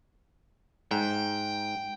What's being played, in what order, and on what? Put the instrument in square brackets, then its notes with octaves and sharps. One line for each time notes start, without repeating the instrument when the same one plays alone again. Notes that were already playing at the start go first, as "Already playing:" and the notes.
[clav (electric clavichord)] G#2 [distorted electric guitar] G5